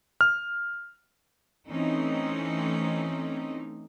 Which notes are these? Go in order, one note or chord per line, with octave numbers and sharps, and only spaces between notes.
F6
E3 A3 C4 C#4 D#4